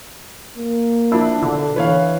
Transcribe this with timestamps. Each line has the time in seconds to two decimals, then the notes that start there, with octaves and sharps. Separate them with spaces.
0.57 A#3
1.12 F3 D4 E4
1.42 B2 D3
1.76 E3 B4 C#5 F5